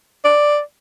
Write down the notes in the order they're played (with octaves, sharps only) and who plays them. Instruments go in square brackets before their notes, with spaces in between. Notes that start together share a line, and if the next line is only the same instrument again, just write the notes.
[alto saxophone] D5